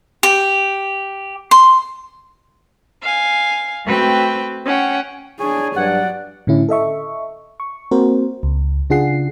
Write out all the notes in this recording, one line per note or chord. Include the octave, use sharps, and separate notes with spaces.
G4
C6
F5 G#5
A3 C4 F#4 B4 G5
C#4 F#5 G5
D4 G#4 C#5 G#5
G2 F#3 D5 F#5
A2 D3 C#4 E4
A4 D#5 E5 C#6
C#6
A#3 C4 F#4 A#4 C5
C#2
C#3 D4 F4 G#4 F#5 C7